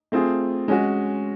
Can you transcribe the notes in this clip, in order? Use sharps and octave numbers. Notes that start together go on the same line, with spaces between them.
A3 C4 F4 G#4
G#3 C#4 F#4